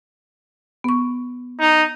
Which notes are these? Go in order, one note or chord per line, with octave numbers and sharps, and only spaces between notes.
B3 C#6
D#4